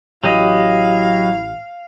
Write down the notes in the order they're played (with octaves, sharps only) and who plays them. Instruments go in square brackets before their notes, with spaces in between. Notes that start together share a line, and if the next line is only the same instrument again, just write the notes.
[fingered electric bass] A1 [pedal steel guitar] F#3 G4 D#5 [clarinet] E4 [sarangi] F5